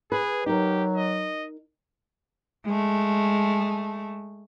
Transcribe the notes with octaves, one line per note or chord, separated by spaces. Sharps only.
G#4 B4
F#3 D#4 G4 A#4
D#5
G#3 A3